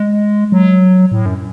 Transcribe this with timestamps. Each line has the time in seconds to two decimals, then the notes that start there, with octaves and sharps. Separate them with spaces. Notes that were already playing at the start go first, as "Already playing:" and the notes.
Already playing: G#3
0.52 F#3
1.12 A2
1.26 F#2